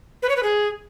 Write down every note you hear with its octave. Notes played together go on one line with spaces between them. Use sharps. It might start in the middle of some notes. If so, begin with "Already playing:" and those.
B4
C#5
B4
G#4